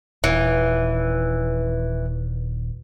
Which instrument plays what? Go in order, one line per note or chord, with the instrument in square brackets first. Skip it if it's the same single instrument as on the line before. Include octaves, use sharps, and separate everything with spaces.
[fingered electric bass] D#1 [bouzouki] E3